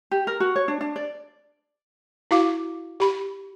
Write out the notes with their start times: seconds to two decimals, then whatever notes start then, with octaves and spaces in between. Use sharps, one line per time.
0.11 G4
0.27 A#4
0.40 F#4
0.56 C#5
0.68 D4
0.81 D4
0.96 D5
2.31 E4 F#4 F5 D6
3.00 G4 B5